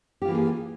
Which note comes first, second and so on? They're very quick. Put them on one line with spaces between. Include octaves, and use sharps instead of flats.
G4 F4 E3 A#3 G#4